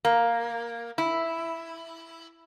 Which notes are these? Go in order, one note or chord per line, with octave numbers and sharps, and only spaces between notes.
A#3
E4